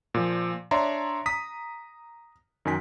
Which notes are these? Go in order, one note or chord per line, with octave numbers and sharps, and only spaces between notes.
A#2 F3
D4 C#5 D5 E5 A#5 C6
A#5 D#6 B6
F#2 D#3 G#5 B6